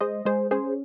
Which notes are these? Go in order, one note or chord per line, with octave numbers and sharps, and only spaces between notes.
G#3 C5 D#5
G#3 G#4 C5
C#4 G#4 C5